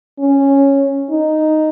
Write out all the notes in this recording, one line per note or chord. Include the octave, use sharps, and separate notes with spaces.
C#4
D#4